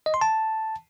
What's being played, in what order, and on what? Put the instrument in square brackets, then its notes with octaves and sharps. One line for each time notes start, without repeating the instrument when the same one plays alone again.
[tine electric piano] D#5
C6
A5